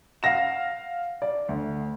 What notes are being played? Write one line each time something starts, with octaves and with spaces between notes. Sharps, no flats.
F5 F#5 A#6 E7
D5
D2